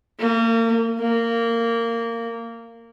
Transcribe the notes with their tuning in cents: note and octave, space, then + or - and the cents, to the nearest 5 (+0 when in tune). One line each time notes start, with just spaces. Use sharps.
A#3 -35
A#3 -15